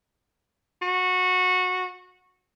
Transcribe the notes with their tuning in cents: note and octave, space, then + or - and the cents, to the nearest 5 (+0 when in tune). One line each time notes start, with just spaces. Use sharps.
F#4 -15